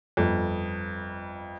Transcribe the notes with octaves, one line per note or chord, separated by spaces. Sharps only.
G1 F2